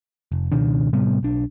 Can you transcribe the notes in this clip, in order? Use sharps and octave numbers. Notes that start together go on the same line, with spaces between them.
F1
C#2 B2 D#3 D4
A2 C3 G3 B3
B1 D4